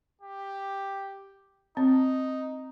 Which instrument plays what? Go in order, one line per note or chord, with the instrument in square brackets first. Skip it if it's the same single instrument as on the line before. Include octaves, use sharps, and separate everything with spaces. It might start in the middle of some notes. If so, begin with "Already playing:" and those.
[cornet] G4
[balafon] C4 [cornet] D#4